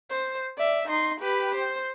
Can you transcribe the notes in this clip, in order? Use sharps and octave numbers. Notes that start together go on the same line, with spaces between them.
C5
D5 E5
D#4 C6
G4 B4
C5